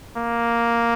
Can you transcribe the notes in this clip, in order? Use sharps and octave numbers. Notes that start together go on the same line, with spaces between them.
A#3